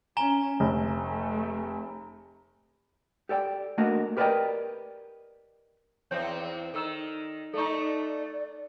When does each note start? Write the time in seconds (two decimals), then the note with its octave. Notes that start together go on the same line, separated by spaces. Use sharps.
0.17 C#4 G#5 A#5 G7
0.60 F1 A3
3.29 G4 A4 D5 G5
3.78 A3 A#3 D4 F#4 A#4 D#5
4.17 G4 A#4 B4 D5 D#5 G5
6.11 E2 C4 C#5 G6
6.74 D#3 A4 E6 E7
7.54 A3 D#4 A4 D5 C#6
7.80 D5